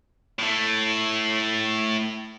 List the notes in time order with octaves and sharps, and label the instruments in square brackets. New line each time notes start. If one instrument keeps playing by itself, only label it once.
[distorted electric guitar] A2 A3